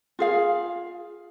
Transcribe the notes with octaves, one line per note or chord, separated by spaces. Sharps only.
F4 G#4 F5